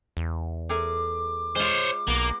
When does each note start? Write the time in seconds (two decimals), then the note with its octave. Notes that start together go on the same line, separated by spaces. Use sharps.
0.17 E2
0.69 A3 G#4 A#4 D6
1.56 G#3 F4 C5 C#5
2.08 B1 A#3 B3